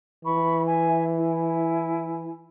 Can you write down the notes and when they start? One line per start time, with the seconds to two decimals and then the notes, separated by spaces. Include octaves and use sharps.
0.25 E3 B5 C#6
0.67 E5 G#5
1.17 E4 G#5